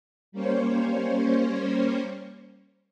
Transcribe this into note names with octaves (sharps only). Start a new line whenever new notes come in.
G3 A#3 C#4 C5 C#5